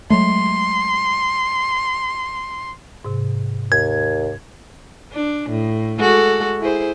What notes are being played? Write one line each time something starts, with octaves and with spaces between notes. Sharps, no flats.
F#3 G#3 A3 C6
G#2 C3
D#2 G#6
D4
A2
G#3 F#4 A4
E4 G#4 C5